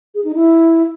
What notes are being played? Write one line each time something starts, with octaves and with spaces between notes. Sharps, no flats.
G#4
D#4
E4